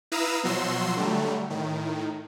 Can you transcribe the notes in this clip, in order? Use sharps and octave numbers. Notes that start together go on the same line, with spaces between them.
E4 B4 F5 A#5 D#6 E6
B2 F3 F#3 F#4 C6 E6
D3 F#3 G3 A3
A2 D#3